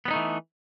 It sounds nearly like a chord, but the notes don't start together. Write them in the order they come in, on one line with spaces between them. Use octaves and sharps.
B3 G3 D#4 A3 E3